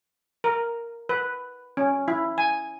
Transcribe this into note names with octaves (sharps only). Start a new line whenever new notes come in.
A#4
B4
C#4
E4
G#5